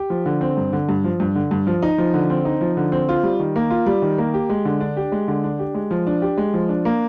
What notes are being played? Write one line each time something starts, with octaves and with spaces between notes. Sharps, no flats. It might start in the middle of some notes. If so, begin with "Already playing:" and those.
Already playing: G4
F3
D3
C4
G2
D3
G2
F3
G2
D3
G2
F3
D#4
F3
D3
C4
D#4
F3
D3
C4
F4
G3
D#3
A#3
F4
G3
D#3
A#3
G4
G#3
D3
D4
G4
G#3
D3
D4
G4
G#3
F3
D4
G4
G#3
F3
D4
A#3